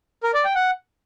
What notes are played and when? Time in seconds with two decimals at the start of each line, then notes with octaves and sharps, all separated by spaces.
0.23 A#4
0.34 D5
0.45 G5
0.55 F#5